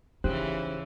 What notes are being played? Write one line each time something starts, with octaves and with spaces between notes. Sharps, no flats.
C#3 E3 D#4 G4 C5 F#6